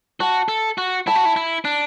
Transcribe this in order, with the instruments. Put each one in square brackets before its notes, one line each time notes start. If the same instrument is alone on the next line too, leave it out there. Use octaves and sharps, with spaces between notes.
[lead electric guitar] F#4 [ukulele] A5
[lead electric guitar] A4
F#4
[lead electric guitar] E4 [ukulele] A5
[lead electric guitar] F#4
E4
E4
D4